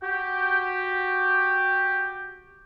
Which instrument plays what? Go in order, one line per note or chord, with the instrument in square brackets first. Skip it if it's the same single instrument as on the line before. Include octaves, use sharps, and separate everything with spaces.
[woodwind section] F#4 G4